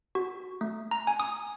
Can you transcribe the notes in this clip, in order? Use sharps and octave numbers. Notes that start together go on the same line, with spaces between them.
F#4
A3
A#5
G#5
D#6